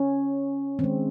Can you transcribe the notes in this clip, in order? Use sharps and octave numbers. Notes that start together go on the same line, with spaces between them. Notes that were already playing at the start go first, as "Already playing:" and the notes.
Already playing: C#4
D#3 G#3 C4